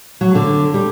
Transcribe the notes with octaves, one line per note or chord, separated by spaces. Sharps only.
F#3
D3
G3